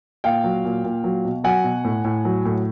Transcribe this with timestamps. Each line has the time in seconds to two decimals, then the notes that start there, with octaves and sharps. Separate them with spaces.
0.24 A#2 F5 G5
0.44 F#3
0.65 A#2
0.84 A#2
1.04 F#3
1.25 B2
1.44 F#3 F#5 G#5
1.64 B2
1.84 A2
2.04 A2
2.25 F#3
2.45 A2